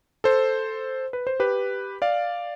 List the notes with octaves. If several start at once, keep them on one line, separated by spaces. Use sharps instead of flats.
A4 C5
B4
C5
G4 B4
D5 F5